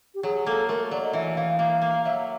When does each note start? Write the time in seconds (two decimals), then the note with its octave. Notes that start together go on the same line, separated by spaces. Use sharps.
0.14 G4
0.23 F#3 G#4
0.46 A#3 A4
0.68 A3 A#4
0.91 F#3 D5
1.02 D#5
1.13 E3 E5
1.36 E3 F5
1.59 A#3 F5
1.81 A#3
1.89 F5
2.05 F#3 E5